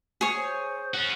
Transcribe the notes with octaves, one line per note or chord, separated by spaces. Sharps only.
G#4 C#5
C5
C#4 F#4